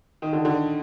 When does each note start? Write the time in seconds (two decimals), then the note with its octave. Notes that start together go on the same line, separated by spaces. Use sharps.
0.22 D#3
0.33 D3
0.45 D3